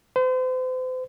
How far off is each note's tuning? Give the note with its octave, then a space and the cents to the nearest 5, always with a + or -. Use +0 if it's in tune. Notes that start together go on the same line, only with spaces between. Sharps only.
C5 -40